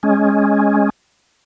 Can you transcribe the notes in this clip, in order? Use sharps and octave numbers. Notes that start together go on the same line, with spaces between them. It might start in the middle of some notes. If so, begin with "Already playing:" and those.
G#3 C#4